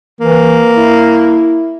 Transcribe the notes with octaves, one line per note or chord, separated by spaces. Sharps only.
E3 A#3
E4